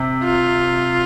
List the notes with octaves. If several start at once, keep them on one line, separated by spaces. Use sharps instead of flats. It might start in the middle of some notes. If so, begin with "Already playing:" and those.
Already playing: C3
F4